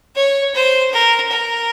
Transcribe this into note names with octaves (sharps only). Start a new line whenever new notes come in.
C#5
C5
A#4
A#4